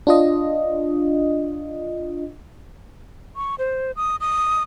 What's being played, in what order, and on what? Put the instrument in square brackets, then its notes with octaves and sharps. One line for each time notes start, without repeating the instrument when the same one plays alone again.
[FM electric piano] D4 F4 D#5
[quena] C#6
C5
D#6
D#6